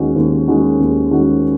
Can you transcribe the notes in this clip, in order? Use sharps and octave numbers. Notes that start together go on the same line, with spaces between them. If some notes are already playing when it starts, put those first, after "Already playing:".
Already playing: D#2 D#3 G#3 C#4 F#4
D#2
D#3 G#3 C#4 F#4
D#2
D#3 G#3 C#4 F#4